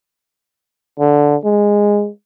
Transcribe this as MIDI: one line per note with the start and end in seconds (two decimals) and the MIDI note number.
1.00 1.36 50
1.44 2.09 56